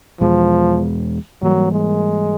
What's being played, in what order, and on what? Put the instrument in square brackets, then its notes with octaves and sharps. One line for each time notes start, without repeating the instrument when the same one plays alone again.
[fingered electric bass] E2 B2 G#3 [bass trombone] F3
[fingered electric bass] G#2 E3 G3 A#3 [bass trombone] F#3
[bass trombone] G#3